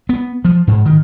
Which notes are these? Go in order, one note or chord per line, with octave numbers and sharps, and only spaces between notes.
B3
F3
G#2
D#3